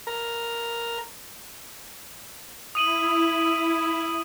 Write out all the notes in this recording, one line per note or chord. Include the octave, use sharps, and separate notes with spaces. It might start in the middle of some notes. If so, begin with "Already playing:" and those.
A#4
E4 D#6 D#7 F#7